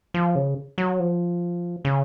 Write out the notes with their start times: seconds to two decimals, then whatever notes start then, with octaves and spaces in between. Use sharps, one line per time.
0.14 F3
0.35 C#3
0.78 F#3
1.00 F3
1.85 C#3